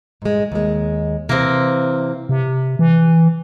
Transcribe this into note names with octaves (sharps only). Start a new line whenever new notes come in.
G#2 G#3
D#2 G#3
C3 E3 A#3 C4
C3
E3